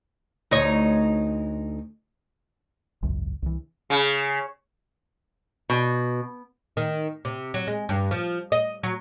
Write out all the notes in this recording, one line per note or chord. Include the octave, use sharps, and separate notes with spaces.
D2 D#4 C#5
G#1 C#2 F#2
C2 E3
C#3
B2
D#3
C3
F#3
G#3
G2
F3
D#5
F#3